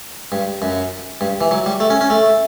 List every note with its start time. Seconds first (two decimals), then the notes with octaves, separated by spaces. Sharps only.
0.32 G2
0.62 F#2
1.21 G2
1.41 E3
1.51 F#3
1.66 G3
1.80 A3
1.90 C#4
2.01 C#4
2.10 A3